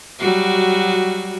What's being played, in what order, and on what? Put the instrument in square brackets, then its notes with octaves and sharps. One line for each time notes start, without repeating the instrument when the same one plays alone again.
[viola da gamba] F#3 G3 F#4